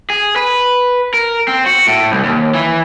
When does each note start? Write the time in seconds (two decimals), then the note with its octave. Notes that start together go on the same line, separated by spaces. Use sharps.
0.10 G#4
0.36 B4
1.14 A#4
1.48 C4
1.66 F#4
1.87 A2
2.12 C2
2.24 D#2
2.54 E3